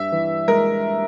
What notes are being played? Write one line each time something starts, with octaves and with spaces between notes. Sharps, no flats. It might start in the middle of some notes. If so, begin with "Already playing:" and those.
Already playing: G2 E5
E3
G#3 A#4